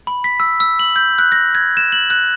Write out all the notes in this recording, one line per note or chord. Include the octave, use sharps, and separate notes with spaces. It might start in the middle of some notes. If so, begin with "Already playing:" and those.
B5
B6
E6
E6
F#7
G6
F#6
A#6
G#6
E7
F#7
F#6